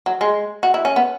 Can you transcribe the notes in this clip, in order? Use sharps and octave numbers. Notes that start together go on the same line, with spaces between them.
F#3
G#3
F#4
E4
C#4
B3